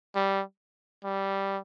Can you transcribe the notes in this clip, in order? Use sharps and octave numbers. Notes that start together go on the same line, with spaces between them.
G3
G3